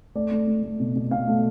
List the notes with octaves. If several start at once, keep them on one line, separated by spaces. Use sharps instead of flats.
A3 D5
A3
A3
A3
B2
B2
B2 F5
A3